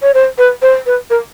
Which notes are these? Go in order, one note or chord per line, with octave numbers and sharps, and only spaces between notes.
C#5
C5
B4
C5
B4
A#4